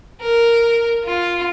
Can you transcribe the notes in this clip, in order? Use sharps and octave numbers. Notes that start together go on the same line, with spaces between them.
A#4
F4